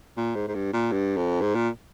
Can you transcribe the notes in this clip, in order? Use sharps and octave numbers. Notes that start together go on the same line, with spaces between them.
A#2
G#2
G#2
G2
A#2
G2
F2
G#2
A#2